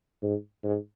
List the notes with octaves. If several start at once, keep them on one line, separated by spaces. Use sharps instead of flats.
G#2
G#2